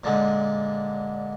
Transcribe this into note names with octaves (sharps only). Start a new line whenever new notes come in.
A#2 D3 G#3